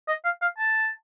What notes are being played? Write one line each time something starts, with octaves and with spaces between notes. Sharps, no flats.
D#5
F5
F5
A5